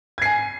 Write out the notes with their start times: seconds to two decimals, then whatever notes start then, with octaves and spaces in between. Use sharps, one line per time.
0.18 G#6
0.22 C7
0.25 G#5